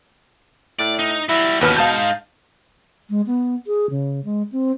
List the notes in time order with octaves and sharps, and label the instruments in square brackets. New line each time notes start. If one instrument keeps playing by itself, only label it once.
[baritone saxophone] A2 [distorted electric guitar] D5
[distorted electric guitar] D#4
[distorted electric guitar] G3 F#4 [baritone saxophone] E4
[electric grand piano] D#2 B4 F6 [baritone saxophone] B2 [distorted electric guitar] E3 C#4
[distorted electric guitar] G#3 D#4 [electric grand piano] F5 A5 G6
[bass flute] G#3
B3
G#4
C#3
G#3
C4